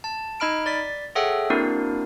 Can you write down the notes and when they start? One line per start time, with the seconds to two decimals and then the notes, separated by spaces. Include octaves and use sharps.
0.04 A5
0.40 D#4 D#5 B5 F6 D7
0.66 D5 A6 B6
1.15 G#4 A4 C#5 E5 F#5 G5
1.50 A#3 C4 D4 E4 F#4 A#4